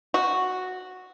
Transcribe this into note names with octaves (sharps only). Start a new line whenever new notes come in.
F#4